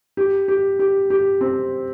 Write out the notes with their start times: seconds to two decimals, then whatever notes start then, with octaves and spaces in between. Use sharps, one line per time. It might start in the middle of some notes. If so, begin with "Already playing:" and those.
0.17 G4
0.48 G4
0.79 G4
1.10 G4
1.41 C4